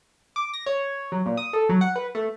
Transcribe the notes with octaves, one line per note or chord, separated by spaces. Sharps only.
D6
A#6
C#5
F#3
A#2
D#6
A4
F#3
F#5
B4
A3